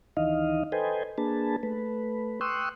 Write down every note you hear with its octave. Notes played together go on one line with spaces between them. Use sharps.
D2 D#3 E3 D#4 D#5 F5
A4 B4 C5 D#5 G5 G#5
A#3 D4 G#4 B4 A5
A3 B4
G5 C6 C#6 D#6 E6 F#6